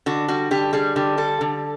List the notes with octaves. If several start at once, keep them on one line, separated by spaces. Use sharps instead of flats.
D3 F#4
G3 F#4
D3 G4
G3 G#4
D3 G4
G3 A4
D3